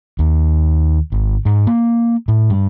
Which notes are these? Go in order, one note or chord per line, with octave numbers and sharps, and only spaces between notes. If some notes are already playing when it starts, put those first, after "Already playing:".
D#2
G#1
G#2
A#3
A2
G2